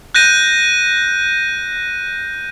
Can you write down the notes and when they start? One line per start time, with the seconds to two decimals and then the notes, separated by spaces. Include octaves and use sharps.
0.15 F#6 G6 A#6 D#7